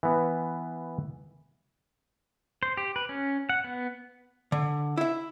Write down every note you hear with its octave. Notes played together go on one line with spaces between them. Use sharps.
E3 B3
C5
G4
B4
C#4
F#5
B3
D3
E4 E5